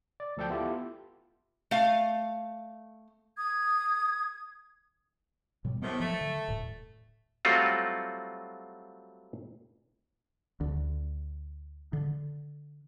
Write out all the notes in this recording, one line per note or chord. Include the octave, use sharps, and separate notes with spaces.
D5
D2 F3 A4 D5 G5 G6
B3 E4 F4 G4 A4
A3 F5
D#6 G#6
B2 F#3 G3
A2 C3 D#3 B3
F3 F#3 A3
D3
D#1 A2
F#3 G3 A3 C4 F4 F#4
D2
D3